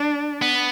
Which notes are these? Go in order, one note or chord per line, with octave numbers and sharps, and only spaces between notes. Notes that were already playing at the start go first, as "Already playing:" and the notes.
Already playing: D4
B3